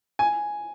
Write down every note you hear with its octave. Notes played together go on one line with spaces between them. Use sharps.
G#5